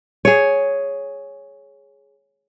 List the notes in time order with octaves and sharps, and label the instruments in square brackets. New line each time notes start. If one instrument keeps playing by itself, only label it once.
[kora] G#4 C#5